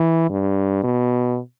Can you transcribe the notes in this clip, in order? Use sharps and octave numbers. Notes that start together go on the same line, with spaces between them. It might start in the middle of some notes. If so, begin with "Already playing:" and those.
Already playing: E3
G2
B2